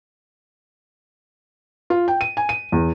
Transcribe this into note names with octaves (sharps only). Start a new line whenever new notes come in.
F4
G5
D#7
G#5
D#7
E2